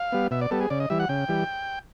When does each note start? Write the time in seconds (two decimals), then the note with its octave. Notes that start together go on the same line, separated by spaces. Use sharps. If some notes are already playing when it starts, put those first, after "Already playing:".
Already playing: F5
0.12 G3 B3
0.31 B2 E5
0.41 D5
0.51 G3 B3 A4
0.60 G#4
0.70 C#3 D5
0.80 D#5
0.90 E3 G3 E5
0.99 F#5
1.09 C#3 G5
1.29 E3 G3